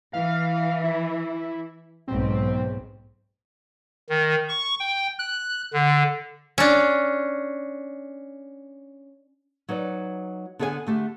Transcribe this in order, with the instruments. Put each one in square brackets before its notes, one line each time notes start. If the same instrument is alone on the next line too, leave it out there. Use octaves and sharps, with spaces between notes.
[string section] E3 [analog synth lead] F5
[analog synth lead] E4
[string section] B1 G#2 [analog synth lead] C4
[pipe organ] D#3
C#6
G5
F#6
D3
[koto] C#4 D4
[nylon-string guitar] F#3 D#4 B4 D5
D3 B3 G#4 A4 C#5 G#5
D3 A3 G4